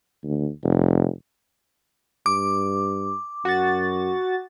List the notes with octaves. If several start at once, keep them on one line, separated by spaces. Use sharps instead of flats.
D2
F1
G2 D6
F#2 F#4 A6